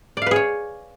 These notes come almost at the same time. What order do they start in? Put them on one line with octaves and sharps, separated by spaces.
D5 F5 B4 G#4 C#5